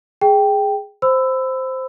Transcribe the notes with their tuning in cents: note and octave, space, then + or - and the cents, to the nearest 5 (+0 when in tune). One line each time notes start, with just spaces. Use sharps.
G#4 +0 G5 +0
C5 +0 B5 +35 E6 +0